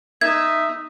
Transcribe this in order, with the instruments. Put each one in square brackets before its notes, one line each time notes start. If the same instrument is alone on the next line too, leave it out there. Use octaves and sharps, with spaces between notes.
[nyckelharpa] D#4 [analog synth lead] E5 [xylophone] G#6